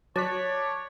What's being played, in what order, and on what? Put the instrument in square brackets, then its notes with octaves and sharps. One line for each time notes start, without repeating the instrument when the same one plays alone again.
[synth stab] F#3 [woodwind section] C#5 [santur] D5 [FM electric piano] A5 F#6 B6